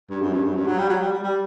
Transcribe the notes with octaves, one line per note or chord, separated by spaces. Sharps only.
G2
F#2
G2
F#2
G2
F#3
G3
F#3
G3
G3
G3